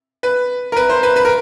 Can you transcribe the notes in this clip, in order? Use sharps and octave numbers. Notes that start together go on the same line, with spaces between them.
B4
A#4
B4
C5
B4
B4
A#4